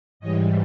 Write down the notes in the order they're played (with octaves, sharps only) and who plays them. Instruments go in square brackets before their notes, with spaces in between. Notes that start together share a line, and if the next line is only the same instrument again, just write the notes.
[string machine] G#2 E3 G3 C#5 D#5